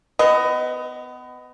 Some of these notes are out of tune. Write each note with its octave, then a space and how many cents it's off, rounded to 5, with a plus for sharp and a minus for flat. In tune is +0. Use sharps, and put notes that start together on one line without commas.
B3 +25 D#5 +0